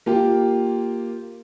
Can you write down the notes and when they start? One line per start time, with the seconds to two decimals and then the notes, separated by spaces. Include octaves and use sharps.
0.06 A#3 F4 G4